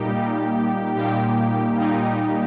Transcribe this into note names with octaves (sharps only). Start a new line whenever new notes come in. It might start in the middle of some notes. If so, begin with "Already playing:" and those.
Already playing: A#2 G3 A#3 D#4 G4
A#2 G3 A#3 D#4
A#2 G3 A#3 D#4 G4
A#2 G3 A#3 D#4